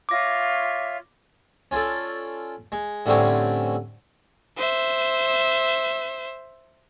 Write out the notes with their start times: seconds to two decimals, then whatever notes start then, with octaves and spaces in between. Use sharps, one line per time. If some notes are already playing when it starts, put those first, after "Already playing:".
0.09 F4 C#5 E5 D6 A#6
1.71 C#4 F4 A4 D5
2.72 G#3
3.06 A2 D3 G3 C4 C#4 G4
4.57 C5 E5